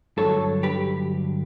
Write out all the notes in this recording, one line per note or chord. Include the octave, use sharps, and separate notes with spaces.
G2 D3 F#3 A4 C#5
G4 B4